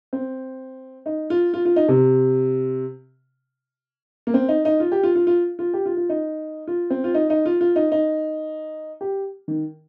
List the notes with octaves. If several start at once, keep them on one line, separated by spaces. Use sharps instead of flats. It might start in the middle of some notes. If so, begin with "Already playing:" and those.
C4
D#4
F4
F4
F4
D#4
C3
A#3
C4
D#4
D#4
F4
G4
F4
F4
F4
F4
G4
F4
F4
D#4
F4
C4
F4
D#4
D#4
F4
F4
D#4
D#4
G4
D#3